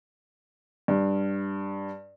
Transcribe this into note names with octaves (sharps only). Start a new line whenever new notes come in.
G2